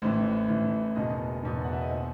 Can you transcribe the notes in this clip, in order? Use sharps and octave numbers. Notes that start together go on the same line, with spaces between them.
A1 A2 E3 C5
A1 A2 E3
F#1 E2 B2 D#5
F#1 E2 B2
F#5
E5
D#5
B2 C5